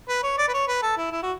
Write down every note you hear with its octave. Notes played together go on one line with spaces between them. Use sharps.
B4
C#5
D5
B4
C#5
B4
A4
E4
E4
F#4